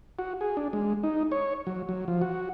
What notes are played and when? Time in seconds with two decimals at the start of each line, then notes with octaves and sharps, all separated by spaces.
0.19 F#4
0.41 G#4
0.57 D4
0.73 G#3
1.03 D#4
1.32 C#5
1.67 F#3
1.89 F#3
2.08 F3
2.22 F#4